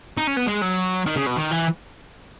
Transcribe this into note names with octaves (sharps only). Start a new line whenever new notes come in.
D#4
C#4
B3
G#3
F#3
D#3
C#3
B2
D#3
E3